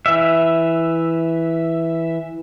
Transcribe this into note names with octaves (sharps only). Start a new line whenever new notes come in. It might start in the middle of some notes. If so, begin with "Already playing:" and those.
E3 E5